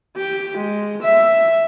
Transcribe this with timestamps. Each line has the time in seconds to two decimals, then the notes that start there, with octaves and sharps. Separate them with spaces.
0.17 G4
0.57 G#3
1.02 E5